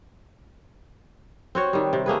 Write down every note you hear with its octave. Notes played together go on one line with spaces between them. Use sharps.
C4 F#4 C#5
D#3 G3
C3
A3 A#3 G#4 B4